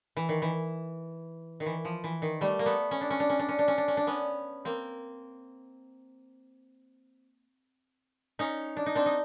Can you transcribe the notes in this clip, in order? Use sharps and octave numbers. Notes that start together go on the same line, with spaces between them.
E3
D#3
E3
D#3
E3
F3
E3
D#3
G3 A3
A#3
A3 B3
C#4
D4
C#4
D4
C#4
D4
C#4
D4
C#4
D4
C#4
D4
B3 C#4
A#3 C4
C#4 D#4
D4
D#4
C4 D4
D#4